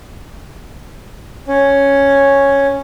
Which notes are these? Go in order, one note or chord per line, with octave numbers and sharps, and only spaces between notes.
C#4